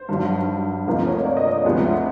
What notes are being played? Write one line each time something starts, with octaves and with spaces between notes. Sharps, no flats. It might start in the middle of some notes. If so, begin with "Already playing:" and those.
Already playing: C5
G2 D#3 F#3
D2 C3 F3 A#3 D#4 B4
C#5
D5
D#5
D5
D2 C3 F3 G#3 B3
E5